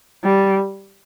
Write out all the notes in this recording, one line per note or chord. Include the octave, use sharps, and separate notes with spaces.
G3